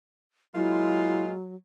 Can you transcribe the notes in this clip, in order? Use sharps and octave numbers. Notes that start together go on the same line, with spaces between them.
A#2 F#3 G#3 E4 F4